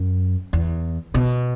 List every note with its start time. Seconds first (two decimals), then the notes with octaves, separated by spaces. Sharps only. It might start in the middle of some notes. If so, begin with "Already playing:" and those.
Already playing: F#2
0.53 E2
1.14 B2